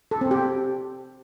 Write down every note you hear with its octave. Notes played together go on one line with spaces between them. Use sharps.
A4
C4
G4